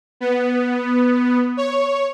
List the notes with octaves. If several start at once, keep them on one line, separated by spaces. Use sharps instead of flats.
B3
C#5